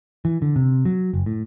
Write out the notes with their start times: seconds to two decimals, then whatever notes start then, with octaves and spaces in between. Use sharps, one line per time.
0.25 E3
0.42 D3
0.56 C3
0.85 F#3
1.13 F#1
1.26 A2